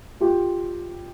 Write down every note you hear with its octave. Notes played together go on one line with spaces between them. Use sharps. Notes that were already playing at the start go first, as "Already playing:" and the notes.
F4 G4